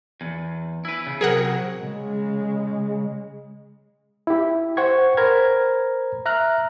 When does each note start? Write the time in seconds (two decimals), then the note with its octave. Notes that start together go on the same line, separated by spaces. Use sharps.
0.21 E2
0.85 E4 B4
1.07 C#3
1.21 C3 F#3 G#4 A#4 F#5
1.77 C#3 G#3
4.27 E4 G4
4.77 C5 F#5 G5 C#6 G#6
5.17 A#4 C5 A#5 B5 F6 G#6
6.26 E5 A#5 F6 F#6